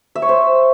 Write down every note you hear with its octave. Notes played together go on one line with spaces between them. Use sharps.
E5
C#5
C5